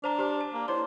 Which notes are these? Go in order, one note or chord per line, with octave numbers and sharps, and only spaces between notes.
D4 C5 A#5 D6
G4 C5
A5
A#3
E4 C5 C#5 D6